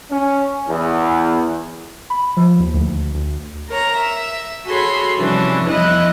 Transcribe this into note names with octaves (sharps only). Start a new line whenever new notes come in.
C#4
E2
B5
F3
D#2
D2
D2
A#4 C#5 A#5
E5
F#4 G#4 A4 C#5 B5 C6
C3 E3 F3 G3 C#4 D4
E2 F3 G3 E4 D#5 F#6